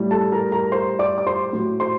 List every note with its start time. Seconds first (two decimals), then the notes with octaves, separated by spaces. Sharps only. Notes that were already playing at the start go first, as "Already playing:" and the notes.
Already playing: A2 G3
0.11 A4 A5
0.32 A#4 A#5
0.52 A#4 A#5
0.72 C5 C6
0.99 D5 D6
1.18 D6
1.27 C5 C6
1.53 A2 F#3
1.80 C5 C6